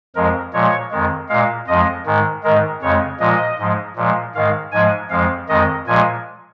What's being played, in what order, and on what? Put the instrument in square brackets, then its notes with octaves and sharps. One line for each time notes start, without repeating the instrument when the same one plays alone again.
[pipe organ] F2 F3 G#3 A#4
A#2 F3 G#3 C#5
F2 D#3 G#3
A#2 G#3 F5
F2 F3 G#3 D#5
G#2 D#3 G#3
G#2 D#3 G#3 A#4
F2 C#3 G#3 C#5
A#2 F3 G#3 D#5
G#2 F3 G#3
A#2 F3 G#3
G#2 D#3 G#3 F5
G#2 F3 G#3 G#5
F2 F3 G#3 F5
F2 D#3 G#3 D#5
A#2 F3 G#3 G#5